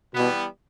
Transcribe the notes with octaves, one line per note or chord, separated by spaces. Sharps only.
B2 E3 G3 B3